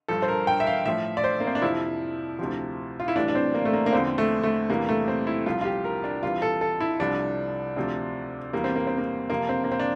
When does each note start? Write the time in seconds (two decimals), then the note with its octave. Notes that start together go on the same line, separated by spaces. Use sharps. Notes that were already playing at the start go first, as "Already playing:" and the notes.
0.08 G2 F3 A4
0.22 C5
0.28 A#4
0.47 G5
0.60 E5
0.67 F5
0.85 A2 F3 E5
1.17 D5
1.24 C5
1.40 A#3
1.47 C4
1.55 D4
1.62 F2 C3 F3 E4
2.39 D2 C3 F3
3.00 F4
3.08 E4
3.16 A2 E3 G3 D4
3.28 D4
3.35 C4
3.54 A#3
3.65 A3
3.73 A#3
3.86 A#3
3.93 E2 D3 F3 C4
4.18 A3
4.43 A3
4.69 E2 C3 E3 G3 A#3
4.89 A3
5.08 C4
5.27 E4
5.46 C2 C3 F3 F4
5.61 F4
5.65 G4
5.84 A#4
6.04 D4
6.23 C2 C3 E3 F4
6.42 A4
6.61 A4
6.80 E4
7.00 C2 C3 F3 D4
7.77 D2 C3 F3
8.53 E2 E3 G3 A#3
8.64 C4
8.75 A#3
8.87 C4
8.98 A#3
9.30 F2 C3 F3 A#3
9.49 C4
9.64 A#3
9.72 C4
9.80 D4